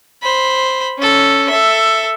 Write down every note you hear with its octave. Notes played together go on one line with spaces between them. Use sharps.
C5 B5
C#4 A4
A4 E5